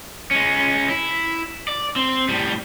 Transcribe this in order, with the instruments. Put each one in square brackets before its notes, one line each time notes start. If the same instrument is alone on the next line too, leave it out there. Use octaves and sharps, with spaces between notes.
[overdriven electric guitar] G#3 C#4
E4
D5
C4
A2 G3